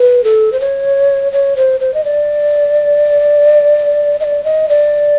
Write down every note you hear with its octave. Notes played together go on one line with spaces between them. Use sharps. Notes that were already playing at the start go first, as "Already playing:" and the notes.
Already playing: B4
A4
C5
C#5
C#5
C5
C5
D#5
D5
D#5
D5
D#5
D5